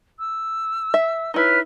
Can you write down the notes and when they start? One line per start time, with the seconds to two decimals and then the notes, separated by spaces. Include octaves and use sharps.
0.19 E6
0.94 E5
1.34 D#4 E4 B4 C#5 F6